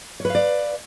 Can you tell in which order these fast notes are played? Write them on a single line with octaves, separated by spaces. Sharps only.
C#5 B4 F5 D5